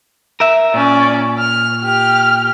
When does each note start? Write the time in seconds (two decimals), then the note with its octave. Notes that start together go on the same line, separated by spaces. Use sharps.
0.40 A#4 E5
0.74 A#2 C#4 D5
1.39 F6
1.82 G4 F6